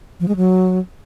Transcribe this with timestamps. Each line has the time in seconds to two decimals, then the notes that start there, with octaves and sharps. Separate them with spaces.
0.20 F3
0.28 G#3
0.36 F#3